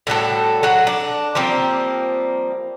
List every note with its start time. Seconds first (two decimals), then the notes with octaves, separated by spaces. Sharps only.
0.07 A2 G3 F#4 A4
0.63 F#3 F#4 F#5
0.87 D4
1.35 F3 G3 A#3 C4